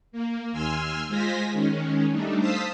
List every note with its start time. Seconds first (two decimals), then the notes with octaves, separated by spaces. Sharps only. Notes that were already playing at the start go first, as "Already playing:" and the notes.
0.12 A#3
0.52 D#2 G#5 C6 E6 F6
1.08 G#3 F4 C5 G#5 A#6 B6
1.52 D#3 G#3 C#4
2.11 G3 A3 D4 D#4
2.39 C5 F5 A5 D#6 E6 B6